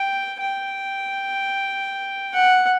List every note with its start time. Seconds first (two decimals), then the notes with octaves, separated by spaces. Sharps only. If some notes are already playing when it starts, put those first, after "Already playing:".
Already playing: G5
0.40 G5
2.34 F#5